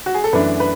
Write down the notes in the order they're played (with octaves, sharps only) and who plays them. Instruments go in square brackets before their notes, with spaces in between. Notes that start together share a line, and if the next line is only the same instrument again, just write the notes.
[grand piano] F#4
G#4
A4
F#2 E3 A3 D4 B4
B4